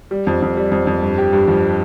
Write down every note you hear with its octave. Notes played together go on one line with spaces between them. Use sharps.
G3
F2
F2
G3
F2
F2
G2
G4
G2
F3